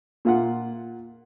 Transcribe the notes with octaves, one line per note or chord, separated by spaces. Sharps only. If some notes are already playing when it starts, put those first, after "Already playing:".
A#2 F4 F#5